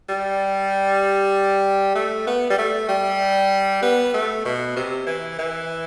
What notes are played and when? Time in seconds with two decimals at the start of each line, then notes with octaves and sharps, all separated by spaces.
0.09 G3
1.95 A3
2.27 B3
2.50 G3
2.58 A3
2.88 G3
3.82 B3
4.14 A3
4.45 B2
4.76 C3
5.06 E3
5.38 E3